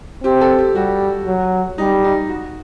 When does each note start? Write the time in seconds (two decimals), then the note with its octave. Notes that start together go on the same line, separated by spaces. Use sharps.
0.24 C4 G4
0.41 A4
0.59 G4
0.75 G3 F#4
1.27 F#3
1.78 G3 D#4
2.04 D#4
2.29 F#4